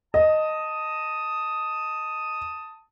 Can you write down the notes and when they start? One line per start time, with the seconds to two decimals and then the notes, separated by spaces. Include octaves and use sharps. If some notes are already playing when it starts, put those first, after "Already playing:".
0.14 D#5 A5 D#6